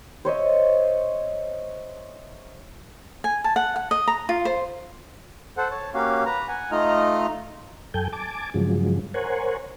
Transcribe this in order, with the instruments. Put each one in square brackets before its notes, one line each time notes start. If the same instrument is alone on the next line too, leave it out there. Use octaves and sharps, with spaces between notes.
[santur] C5 C#5 D#5 E5
[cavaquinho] G#5
A5
F#5
F#5
D#5
A#5
F4
C5
[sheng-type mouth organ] A4 C5 F#5
C#5 A5
A#3 C#4 F#4 G4 F5
B4 A#5
F#5 G#5
A3 D#4 F4 D#5 A#5 F6
[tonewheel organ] F#2 A4 G5 G#5 G6
G#5 A5 D6
G2 C#3 F3 F#3 G#3
A#4 C5 C#5 F#5 G#5